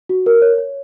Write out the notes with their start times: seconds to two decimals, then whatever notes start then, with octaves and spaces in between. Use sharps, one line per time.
0.09 F#4
0.26 A#4
0.42 C#5
0.58 C#5